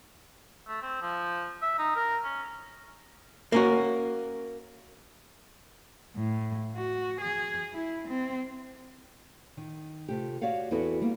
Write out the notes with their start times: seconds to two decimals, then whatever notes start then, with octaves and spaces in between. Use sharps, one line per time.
0.67 A3
0.82 C4
1.01 F3
1.62 E5
1.78 D#4
1.96 A#4
2.24 C#4
3.52 A#3 C#4 F#4
6.16 A2
6.76 F#4
7.21 G#4
7.73 E4
8.08 C4
9.57 D#3
10.08 C3 A3 F4 G4
10.41 F#4 G4 C#5 D5 F5 F#5
10.71 E2 B3 C4 E4 F#4 A4
11.01 G3 A#3 B3